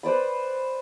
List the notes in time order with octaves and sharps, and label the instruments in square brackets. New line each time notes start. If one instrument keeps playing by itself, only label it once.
[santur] B4 C5 D5 B5